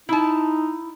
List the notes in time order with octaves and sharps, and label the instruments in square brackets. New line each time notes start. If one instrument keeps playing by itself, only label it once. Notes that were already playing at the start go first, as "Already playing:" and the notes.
[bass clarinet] D#4 [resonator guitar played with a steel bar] E4 A5